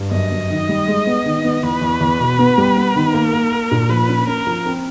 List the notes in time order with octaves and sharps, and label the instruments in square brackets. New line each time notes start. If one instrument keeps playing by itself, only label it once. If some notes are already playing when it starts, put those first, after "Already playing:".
Already playing: [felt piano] G2
[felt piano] F#2 [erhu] D#5
[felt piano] F#2
D#3
G3
G#3
B3
D#3
B3
[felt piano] E2 [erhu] B4
[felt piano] E2
E2
B2
B3
G3
B3
D#3
[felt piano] A#3 [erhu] A#4
[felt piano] A#3
A#3
A#2
[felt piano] F3 [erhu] B4
[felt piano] C#4
[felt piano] C#4 [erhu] A#4
[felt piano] F3
C4